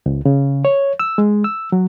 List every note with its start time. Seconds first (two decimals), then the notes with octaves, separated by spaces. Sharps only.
0.06 C#2
0.25 C#3
0.65 C#5
1.00 E6
1.18 G#3
1.44 E6
1.72 F#3